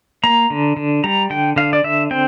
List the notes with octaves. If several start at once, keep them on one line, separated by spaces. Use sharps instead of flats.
A#3 A#5
D3
D3
G3 A#5
D3 G5
D3 F5
D5
D3 E5
C4 G5